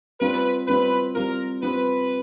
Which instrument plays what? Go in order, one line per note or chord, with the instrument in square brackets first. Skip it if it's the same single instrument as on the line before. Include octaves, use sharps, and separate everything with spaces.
[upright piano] G3 C4 F4 [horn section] B4
[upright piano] G3 C4 F4 [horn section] B4
[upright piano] G3 C4 F4 [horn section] A#4
[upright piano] G3 C4 F4 [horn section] B4